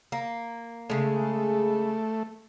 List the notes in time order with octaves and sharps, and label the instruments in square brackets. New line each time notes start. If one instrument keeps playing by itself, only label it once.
[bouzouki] A#3
[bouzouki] C#3 G#3 [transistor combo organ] A3